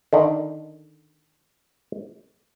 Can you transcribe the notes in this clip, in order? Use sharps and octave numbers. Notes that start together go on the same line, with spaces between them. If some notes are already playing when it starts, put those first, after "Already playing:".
D3 D#3 D5